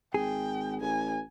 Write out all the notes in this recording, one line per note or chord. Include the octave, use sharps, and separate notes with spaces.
G#1 G#4 G5
A1 G#5